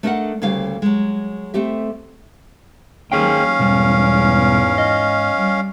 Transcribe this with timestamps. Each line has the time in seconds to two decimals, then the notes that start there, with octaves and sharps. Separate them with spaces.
0.03 A3 D4 A#4 D5 D#5 F#5
0.42 D2 C#3 G3 A#3 F5
0.82 F#3 G#3
1.54 A3 C4 G4 E5
3.12 D#2 D#3 F#3 C#4 G#4 F5 G5
3.59 E2 G#2 B2 G3
4.78 D#5
5.34 G3